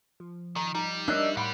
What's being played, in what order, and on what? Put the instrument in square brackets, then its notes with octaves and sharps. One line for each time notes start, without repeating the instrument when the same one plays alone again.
[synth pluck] F3
[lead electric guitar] D#3 [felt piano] A#5
[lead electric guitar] G3 [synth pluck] D#4 [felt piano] A#5
[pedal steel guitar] D4 D#5 E6 [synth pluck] A#4 C#5 E5 [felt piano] F#6
[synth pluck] A2 [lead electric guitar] G3 [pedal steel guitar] F#5 B5 C6